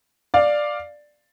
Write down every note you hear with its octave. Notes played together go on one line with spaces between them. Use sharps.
D5 F5